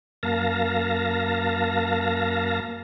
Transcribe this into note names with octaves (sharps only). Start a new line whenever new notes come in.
F#2 A#3 F5 A5 A#6